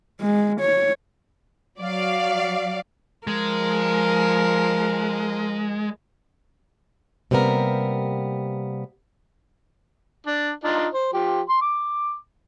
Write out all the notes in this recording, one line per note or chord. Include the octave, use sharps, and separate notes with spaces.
G#3
C#5
F#3 D5 F5
F3 G#3 A#4
C3 G3 A#3 B3 A#4
D4
D4 D#4 F4
C5
F3 G4
C6
D6